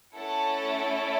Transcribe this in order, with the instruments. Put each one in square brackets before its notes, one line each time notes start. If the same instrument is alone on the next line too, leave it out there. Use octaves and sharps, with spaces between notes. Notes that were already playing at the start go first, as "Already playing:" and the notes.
[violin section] A3 C#4 E4 A4 F#5